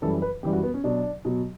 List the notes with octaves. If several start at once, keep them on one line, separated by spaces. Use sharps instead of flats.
F#2 E3 G3 A4
B4
F#2 E3 G3 G4
F#4
B3
C#4
B2 F#3 D4
B2 F#3